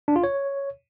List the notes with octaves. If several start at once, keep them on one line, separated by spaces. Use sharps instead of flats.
D4
F4
C#5